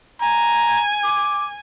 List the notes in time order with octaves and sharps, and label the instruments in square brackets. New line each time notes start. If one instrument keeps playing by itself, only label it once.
[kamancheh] G#5 [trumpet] A#5
[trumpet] D6